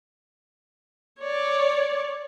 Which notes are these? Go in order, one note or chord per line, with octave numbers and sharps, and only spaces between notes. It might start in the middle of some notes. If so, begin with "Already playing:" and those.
C#5 D5